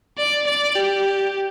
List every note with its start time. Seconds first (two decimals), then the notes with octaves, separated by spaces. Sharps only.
0.18 D5
0.47 D5
0.76 G4